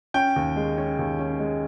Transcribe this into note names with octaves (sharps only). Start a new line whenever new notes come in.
C#4 G5
D#2
G#3
C#4
D#2
C#4
G#3